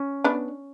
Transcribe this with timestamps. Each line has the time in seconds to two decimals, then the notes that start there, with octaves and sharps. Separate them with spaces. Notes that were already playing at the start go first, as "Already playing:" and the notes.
Already playing: C#4
0.24 B3 D4